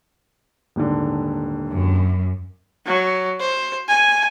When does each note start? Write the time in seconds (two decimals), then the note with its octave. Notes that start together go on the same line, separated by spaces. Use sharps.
0.76 D#1 G#2 D3
1.70 F#2
2.86 F#3
3.40 C5
3.88 G#5